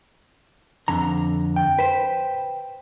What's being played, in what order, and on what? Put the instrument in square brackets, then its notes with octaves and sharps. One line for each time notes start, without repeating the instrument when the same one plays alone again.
[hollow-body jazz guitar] F2 D3 A#5
[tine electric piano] G5
[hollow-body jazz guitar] B4 C5